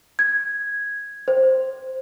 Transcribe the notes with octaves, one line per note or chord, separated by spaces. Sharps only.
G#6
C5